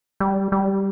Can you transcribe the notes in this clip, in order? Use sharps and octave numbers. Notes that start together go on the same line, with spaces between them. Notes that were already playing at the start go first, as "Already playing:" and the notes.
G3
G3